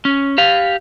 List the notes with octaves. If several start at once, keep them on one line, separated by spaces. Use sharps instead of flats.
C#4
G4 F5